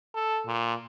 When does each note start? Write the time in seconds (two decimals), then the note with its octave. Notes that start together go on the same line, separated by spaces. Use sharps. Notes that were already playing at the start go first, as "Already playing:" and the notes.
0.14 A4
0.46 A#2